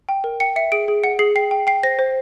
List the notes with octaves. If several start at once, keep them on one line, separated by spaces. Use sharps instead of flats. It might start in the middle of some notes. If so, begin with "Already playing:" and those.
G5
A#4
G5 C#7
E5 C#7
G#4 D7
G#4
F#5 C#7
G#4 C7
G5 C7
G5
G5 C7
C5 A#6
C5